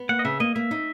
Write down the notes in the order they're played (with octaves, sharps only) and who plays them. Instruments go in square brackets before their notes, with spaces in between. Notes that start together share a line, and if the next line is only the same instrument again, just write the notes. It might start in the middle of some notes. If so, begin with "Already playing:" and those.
Already playing: [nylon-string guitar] B3
[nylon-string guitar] A#3 [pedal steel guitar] F#5
[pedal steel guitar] D#5
[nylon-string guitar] C#3 [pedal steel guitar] E5
[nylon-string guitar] A#3 [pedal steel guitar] D#5
[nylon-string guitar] A#3 [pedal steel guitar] E5
[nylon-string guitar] D#4